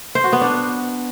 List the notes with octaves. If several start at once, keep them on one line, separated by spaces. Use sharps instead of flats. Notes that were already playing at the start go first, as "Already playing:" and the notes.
C5
F#4
B3
D4